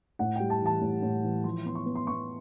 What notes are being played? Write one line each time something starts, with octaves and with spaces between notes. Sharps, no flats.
A2 F#5
G3 G5
A5
E3 A5
A2
A2
E3
F3 C6
B3 C6
C#6
B3
C6
B3 C#6